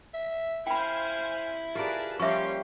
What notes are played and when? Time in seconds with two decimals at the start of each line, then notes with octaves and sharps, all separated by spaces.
0.14 E5
0.67 E4 C5 F5 G5 G#5 B5
1.75 F4 G4 G#4 A#4 B4 D5 A5
2.20 F3 G3 A#3 C#4 G4 E5 C6 C#6